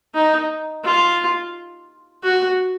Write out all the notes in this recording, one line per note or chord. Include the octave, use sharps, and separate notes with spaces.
D#4
F4
F#4